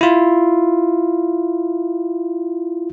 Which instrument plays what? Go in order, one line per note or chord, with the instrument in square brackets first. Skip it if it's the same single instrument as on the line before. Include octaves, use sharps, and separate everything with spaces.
[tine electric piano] E4 F4